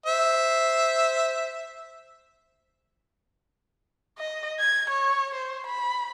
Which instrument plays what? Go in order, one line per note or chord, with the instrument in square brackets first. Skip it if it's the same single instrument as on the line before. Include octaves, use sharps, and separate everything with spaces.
[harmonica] C5 E5
[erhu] D#5
G#6
C#5
C5
B5